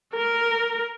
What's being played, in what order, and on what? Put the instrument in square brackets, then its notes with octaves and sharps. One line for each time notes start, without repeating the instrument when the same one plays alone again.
[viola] A#4